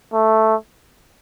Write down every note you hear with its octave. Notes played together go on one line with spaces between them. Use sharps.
A3